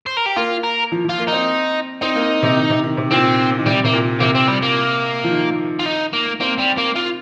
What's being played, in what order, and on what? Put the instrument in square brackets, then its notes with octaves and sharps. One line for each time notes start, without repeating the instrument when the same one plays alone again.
[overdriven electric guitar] C5
A#4
G4
[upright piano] A#3 [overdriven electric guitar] F4
[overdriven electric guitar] A#4
[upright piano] F3
[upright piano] F3 [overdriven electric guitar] F4
[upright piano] A#3
[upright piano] C4 [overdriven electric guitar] D#4
[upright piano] C4 [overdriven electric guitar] D#4
[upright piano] A#3
C3
D#3
C3
D#3
C3
[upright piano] A#2 [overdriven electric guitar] C4
[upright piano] D#3
[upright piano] C3 [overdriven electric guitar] G3
[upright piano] C3 [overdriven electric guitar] A#3
[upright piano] A#2
[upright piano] C3 [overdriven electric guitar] A#3
[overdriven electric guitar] C4
G3
A#3
[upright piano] F3
D#3
[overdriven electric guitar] F4
D#4
A#3
[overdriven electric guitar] A#3 [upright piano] C4
[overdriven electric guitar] G3
A#3
F4